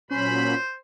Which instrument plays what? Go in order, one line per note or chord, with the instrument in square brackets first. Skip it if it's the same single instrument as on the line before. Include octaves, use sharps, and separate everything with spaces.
[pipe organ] A#2 F#3 B5 [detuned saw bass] C#4 [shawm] C5